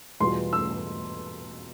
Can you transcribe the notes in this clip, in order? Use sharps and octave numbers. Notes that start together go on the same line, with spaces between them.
E2 B2 G3 B3 F4 C6
E6